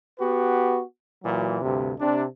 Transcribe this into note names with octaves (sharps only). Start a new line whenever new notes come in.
B3 F#4 G4 B4
A#2 E3 F#3
D2 G2 C3
C3 D4